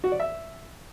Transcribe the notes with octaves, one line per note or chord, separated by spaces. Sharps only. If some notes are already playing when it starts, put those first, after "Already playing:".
F#4
D5
E5